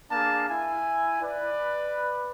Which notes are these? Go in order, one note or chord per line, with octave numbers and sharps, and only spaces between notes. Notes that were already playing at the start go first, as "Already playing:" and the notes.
A#3 D4 G#4 F5 A5
E4 G#5
B4 D5